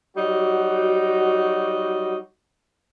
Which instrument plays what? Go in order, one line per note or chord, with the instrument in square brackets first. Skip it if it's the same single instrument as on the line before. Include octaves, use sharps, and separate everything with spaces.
[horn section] F#3 G3 D#4 F#4